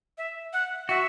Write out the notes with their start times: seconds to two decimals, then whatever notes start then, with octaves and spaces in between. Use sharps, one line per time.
0.18 E5
0.53 F#5
0.89 F#4 E5